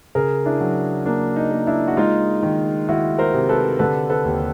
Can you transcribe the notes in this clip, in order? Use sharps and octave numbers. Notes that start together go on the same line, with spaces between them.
C#3 G#4 A#4
D4 E4
F#3
A#3 D4
D#4
A#3
D4 E4
F#4
G#3 D#4 F4
D#3
D#3 E4 F#4
A#4 C5
C3
A4 B4
D3 A4 B4
A4 B4
D#2